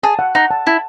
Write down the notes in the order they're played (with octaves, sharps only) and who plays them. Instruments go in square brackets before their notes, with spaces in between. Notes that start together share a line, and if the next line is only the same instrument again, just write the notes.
[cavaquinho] G#4 [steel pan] A5
[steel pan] F#5
[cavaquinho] D#4 [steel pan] F#5
[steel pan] A5
[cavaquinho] E4 [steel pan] A5